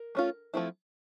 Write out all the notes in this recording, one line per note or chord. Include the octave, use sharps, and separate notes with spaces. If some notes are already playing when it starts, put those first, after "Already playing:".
Already playing: A#4
A3 C#4 F4
F3 A3 C4 E4